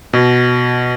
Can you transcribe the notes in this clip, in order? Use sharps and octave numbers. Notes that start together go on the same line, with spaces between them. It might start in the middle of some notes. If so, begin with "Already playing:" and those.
B2